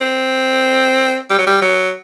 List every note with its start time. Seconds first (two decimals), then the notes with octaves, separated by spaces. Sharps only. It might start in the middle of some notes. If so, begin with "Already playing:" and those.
0.02 C4
1.30 G3
1.39 F#3
1.47 G3
1.62 F#3